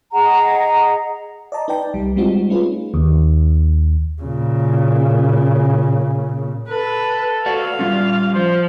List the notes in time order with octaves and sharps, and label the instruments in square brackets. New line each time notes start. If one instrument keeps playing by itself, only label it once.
[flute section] G#4 D#5 F#5 A#5
[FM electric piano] D5 D#5 A5 A#5
D#4 B4 D5 G5 A5
C2 G3
G3 G#3 C4 D#4 F4 F#4
A3 C#4 D#4 F4 G#4 B4
D#2
[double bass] A#2 C#3
[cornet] A4 [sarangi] B4
[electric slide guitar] F#4 D5 F#5 [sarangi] F5
[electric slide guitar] G3 C#4 [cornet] F4
[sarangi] F3 [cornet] C5